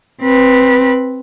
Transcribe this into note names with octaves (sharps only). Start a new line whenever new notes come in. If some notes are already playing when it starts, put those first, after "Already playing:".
C4 B4